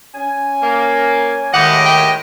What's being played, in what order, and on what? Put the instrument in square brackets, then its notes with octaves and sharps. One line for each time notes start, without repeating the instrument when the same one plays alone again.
[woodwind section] C#4 G#5
[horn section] A#3
[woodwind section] D#2 D#3 G#3 [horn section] A2 G4 D#5 [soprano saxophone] F#5
[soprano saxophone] G5